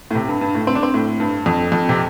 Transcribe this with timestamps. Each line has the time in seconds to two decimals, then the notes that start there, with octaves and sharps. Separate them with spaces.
0.11 A2
0.15 C3
0.28 G2
0.41 G2
0.55 A2
0.67 C4
0.75 D4
0.83 C4
0.94 A2
1.20 G2
1.46 F2
1.72 F2
1.89 C3